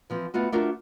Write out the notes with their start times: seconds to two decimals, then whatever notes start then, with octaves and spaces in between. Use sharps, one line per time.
0.10 E3 F3 C4
0.34 A3 B3 F4 F#4
0.52 A3 D4 F4 F#4 A#4